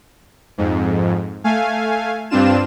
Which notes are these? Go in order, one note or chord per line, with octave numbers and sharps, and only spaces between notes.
F2 G#2
A3 F5 G#5
G2 C4 D4 F4 E7